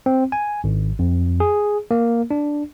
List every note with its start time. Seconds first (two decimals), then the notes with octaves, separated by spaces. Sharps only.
0.06 C4
0.32 G#5
0.64 G#1
0.99 F2
1.40 G#4
1.91 A#3
2.31 D4